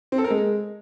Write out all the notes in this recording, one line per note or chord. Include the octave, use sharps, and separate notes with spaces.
C4
A4
A#4
G#3